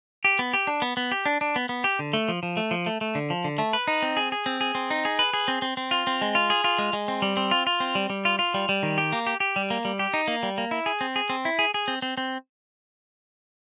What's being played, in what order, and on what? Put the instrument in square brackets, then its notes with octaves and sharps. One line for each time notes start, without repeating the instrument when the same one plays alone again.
[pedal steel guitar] G4
B3
G4
D4
B3
B3
G4
D4
D4
B3
B3
G4
D3
A3
F3
F3
A3
F3
A3
A3
D3
F3
D3
A3
B4
D#4
C4
G#4
G#4
C4
G#4
C4
D#4
G#4
B4
G#4
C4
C4
C4
F4
C4
G#3
F4
G#4
F4
G#3
G#3
C4
G3
C4
F4
F4
C4
G3
G3
F4
F4
G3
G3
D#3
G4
A#3
G4
G4
G3
A#3
G3
G4
D#4
A#3
G3
A#3
E4
G#4
C4
G#4
C4
E4
G#4
G#4
C4
C4
C4